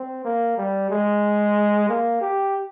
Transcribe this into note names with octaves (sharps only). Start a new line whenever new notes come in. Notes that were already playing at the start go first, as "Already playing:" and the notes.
Already playing: C4
A#3
G3
G#3
A#3
G4